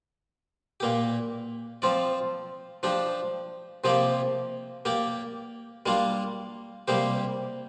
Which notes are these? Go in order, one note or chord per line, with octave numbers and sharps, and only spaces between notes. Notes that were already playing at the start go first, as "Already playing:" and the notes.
A#2 A#3 G4
F3 C4 F4 D5
F3 D4 G4
C3 F3 A#3 G4 D5
A#3 G4 D5
G3 A#3 D4 F4
C3 G3 A#3 G4 C5